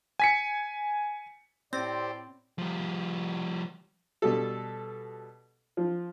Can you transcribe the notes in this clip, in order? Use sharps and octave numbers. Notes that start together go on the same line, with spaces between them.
G#5 B6 C#7
A2 C4 G4 C5 D5
F3 G3
B2 G3 A4
F3